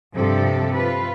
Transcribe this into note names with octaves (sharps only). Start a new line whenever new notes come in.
G2 C3 F3 C4 G4 A4
F4 B4